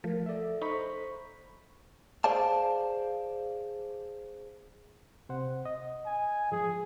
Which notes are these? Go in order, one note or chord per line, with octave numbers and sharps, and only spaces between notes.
F3 A3 A#4
A4 D5 E5
D#4 C5 A#5 B5 C#6 B6
G#4 C5 D5 F5 A5
C3 C5 F#5
D#5
G#5
G#2 F3 G#4